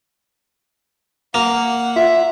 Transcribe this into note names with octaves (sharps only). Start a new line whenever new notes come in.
A#3 F#5
F4 E5